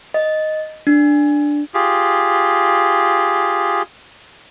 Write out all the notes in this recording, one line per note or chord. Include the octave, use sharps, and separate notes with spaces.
D#5
D4
F4 G4 G#4